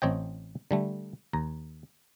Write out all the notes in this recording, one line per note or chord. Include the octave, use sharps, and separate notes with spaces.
A1 C4 C#5 D#5 G5
D3 G3 A3
D#2 A#5